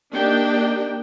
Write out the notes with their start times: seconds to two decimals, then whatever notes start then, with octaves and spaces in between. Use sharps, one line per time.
0.13 A#3 D4 D#4 G4 G5